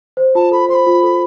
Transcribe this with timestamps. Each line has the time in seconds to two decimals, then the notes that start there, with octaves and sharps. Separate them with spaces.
0.17 C5
0.35 F4 A5
0.51 A4 B5
0.69 C5 C6
0.74 B5
0.86 F4
1.03 A4